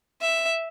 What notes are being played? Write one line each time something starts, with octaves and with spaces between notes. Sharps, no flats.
E5